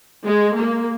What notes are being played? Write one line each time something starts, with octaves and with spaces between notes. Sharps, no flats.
G#3
A#3